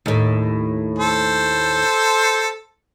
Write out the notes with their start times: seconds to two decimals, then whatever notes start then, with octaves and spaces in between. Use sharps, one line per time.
0.06 D#2 A2
0.98 A4 C5